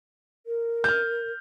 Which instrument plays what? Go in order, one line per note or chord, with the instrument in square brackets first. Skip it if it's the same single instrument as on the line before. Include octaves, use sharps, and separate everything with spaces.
[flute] A#4
[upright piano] F6 G6